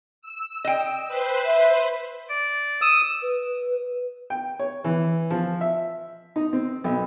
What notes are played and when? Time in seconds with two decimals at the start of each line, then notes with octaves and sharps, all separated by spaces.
0.22 E6
0.65 D#5 G5
1.08 B4 C5
1.45 E5
2.29 D5
2.82 D#6 E6
3.22 B4
4.30 G5
4.59 C#5
4.84 E3
5.31 F3
5.61 E5
6.36 D#4
6.53 C4
6.84 B1